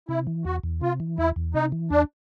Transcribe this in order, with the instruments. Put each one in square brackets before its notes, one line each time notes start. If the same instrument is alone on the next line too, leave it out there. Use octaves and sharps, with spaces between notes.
[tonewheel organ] C3 [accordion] E4
[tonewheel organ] E3
[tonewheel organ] E2 [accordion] F#4
[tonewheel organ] E2
[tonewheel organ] C3 [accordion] F4
[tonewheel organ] E3
[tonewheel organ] E2 [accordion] E4
[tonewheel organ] E2
[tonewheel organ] C3 [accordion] D#4
[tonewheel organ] E3
[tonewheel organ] E2 [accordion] D4